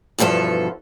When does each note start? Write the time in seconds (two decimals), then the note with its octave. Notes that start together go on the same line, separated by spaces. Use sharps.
0.19 E2 G2 B2 F3 A4